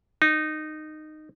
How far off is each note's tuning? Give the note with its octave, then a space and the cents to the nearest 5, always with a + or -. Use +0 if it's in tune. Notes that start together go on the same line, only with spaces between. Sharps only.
D#4 -15